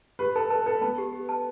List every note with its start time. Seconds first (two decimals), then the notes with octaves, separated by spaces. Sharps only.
0.19 G4 B4
0.36 A4 A5
0.50 A4 A5
0.66 A4 A5
0.81 B3 A5
0.98 G4
1.13 G4
1.29 A5